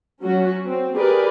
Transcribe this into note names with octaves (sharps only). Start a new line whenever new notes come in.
F#3 C#4 F#4
C4
G4 G#4 A#4 B4 D5